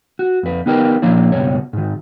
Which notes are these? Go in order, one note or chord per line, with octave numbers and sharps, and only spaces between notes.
F#4
F2 B4
B3 D#4 G4 A#4 B4
A#2 F3 A#3 C#4 D4 E4
C#2 G2 B2 G3 C#5
G#2 D#3